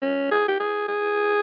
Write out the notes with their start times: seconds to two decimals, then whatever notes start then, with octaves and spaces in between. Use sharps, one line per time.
0.02 C#4
0.31 G#4
0.48 G4
0.60 G#4
0.88 G#4